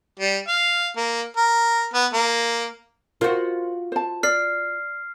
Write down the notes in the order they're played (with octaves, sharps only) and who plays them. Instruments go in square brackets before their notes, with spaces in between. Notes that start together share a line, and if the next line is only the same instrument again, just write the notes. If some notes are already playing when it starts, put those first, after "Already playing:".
[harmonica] G3
F5
A#3
A#4
B3
A#3
[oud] F4 F#4 [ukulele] A#4 C5
[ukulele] C5 A5
[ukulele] D5 [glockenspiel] F6 C7